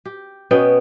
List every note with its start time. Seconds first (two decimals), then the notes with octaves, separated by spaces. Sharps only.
0.05 G4
0.51 B2 B3 C#4 G5